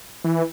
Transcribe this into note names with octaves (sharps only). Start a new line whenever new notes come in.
E3